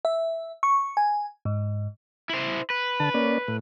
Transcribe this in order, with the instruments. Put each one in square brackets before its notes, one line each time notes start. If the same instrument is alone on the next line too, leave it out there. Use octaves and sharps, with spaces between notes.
[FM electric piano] E5
C#6
G#5
G#2
[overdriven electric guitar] E4 C5
B4
[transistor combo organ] D3 A5
A#3 C#4 D5
A2